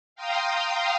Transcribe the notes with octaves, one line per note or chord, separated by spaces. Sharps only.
F5 G5 A#5 C6 D#6